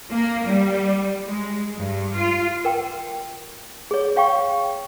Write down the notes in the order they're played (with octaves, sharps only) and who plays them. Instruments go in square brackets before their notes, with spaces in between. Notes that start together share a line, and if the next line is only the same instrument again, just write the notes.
[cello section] A#3
G3
G#3
G2
F4
[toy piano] A#4 G5
G#4 C#5
C#5 F5 G5 C#6